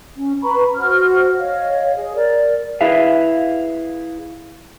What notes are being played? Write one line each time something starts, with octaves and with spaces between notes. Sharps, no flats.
C#4
B4 A#5 B5 C#6
F#4 C5 F6
C#5 D#5 F5
G#4
A#4 D5
E4 G#4 B4 E5 F5